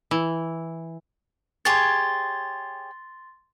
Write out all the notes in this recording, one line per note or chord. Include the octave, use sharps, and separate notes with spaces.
E3
G4 G#4 C#5 C6 A6